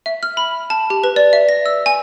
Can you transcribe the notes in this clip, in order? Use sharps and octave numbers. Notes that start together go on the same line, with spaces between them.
E5
F6
B5
A5
G4
B4
D5
E5
A#6
E6
G#5